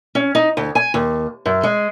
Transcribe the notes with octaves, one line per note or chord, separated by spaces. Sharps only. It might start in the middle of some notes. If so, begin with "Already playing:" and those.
C#4
D#4
D2
G#5
D#2
F#2
G#3